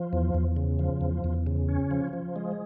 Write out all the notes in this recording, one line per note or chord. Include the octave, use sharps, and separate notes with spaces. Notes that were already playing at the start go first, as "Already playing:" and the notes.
Already playing: F3
E2
E2
C#3
F3
E2
E2
C#3
C#4
F3
F3
G#3